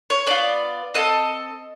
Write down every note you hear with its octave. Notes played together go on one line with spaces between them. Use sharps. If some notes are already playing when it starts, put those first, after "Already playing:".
C#5
B3 D4 F4 D5
C4 E4 A4 D#5